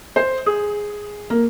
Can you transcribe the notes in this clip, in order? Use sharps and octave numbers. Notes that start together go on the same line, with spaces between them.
C5
G#4
A#3